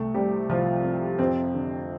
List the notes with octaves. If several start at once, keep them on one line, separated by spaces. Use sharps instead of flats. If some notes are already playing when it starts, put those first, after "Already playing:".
Already playing: C2 A3
C3 G3 G4
C2 F3 F4
C3
F2 C4
D3